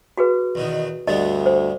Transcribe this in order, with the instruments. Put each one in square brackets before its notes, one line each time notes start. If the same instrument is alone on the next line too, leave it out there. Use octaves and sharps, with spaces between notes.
[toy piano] F#4 G#4 B4
[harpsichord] E2 B2 D#3
[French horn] D2 [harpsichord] G2 D3 B3 [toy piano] D#5
[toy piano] C5